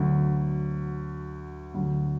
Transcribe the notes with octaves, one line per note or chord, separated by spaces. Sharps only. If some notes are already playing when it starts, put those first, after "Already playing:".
Already playing: D2 D3 F#3
D2 D3 F#3